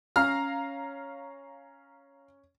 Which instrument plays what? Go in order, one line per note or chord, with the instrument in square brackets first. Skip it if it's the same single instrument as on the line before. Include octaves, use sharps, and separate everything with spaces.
[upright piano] C#4 [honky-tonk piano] F5 A#5 [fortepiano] F6